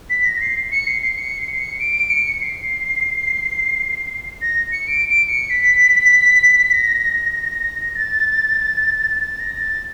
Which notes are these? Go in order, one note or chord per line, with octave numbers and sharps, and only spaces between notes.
B6
A#6
C7
C#7
C7
C7
C#7
C7
C#7
D7
C#7
C7
A#6
C#7
D7
D7
C#7
B6
A#6
A6
A6
A#6
A6